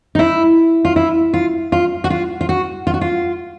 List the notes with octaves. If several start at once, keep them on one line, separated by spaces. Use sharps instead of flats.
D#4
E4
F4
E4
F4
F4
F#4
F4
F4
F#4
F4
F#4
F4